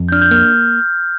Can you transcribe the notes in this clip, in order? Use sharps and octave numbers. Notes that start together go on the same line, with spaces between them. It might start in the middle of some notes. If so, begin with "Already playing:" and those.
Already playing: F2
G6
D4 F6
G6
A#3 F6